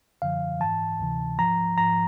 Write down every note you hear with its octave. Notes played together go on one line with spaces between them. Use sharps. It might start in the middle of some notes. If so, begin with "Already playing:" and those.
F#2 D3 F3 F5
G#2 E3 A5
D2 C3 E3
G#2 F3 A#5
G#2 F3 A#5